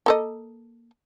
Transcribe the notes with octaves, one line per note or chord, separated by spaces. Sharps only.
A#3 A4 D#5